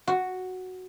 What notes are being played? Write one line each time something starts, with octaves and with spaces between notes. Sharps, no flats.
F#4